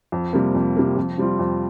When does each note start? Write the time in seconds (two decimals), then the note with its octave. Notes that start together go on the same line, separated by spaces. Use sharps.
0.12 F2
0.33 C3 G3 A#3
0.55 F2
0.76 C3 G3 A#3
0.97 F2
1.18 C3 G3 C4 F4
1.39 F2